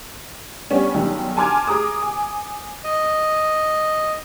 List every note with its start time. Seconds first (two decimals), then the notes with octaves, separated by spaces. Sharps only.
0.70 G3 B3 C#4 D4
0.95 B1 D#3 G3
1.37 G#5 A5 C6 D6 F6 G#6
1.67 G#4 A#5 D6 D#6
2.02 G#5
2.84 D#5